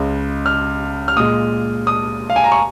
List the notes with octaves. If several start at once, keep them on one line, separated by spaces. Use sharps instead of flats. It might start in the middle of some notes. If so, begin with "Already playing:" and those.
Already playing: C#2 C#3 G#3
F6
F6
A#2 G#3 D#6
D#6
F5
G#5
A#5
C#6